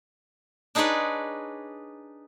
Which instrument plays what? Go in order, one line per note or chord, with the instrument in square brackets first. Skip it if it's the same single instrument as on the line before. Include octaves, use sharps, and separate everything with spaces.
[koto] D4 D#4 G#4 B4 C#5 D5